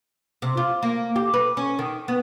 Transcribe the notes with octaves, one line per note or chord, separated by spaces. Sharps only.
C3
F4
A#3
G4
B4
C#4
D#3
B3